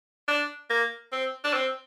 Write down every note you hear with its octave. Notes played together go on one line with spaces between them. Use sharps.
D4
A#3
C4
D4
C4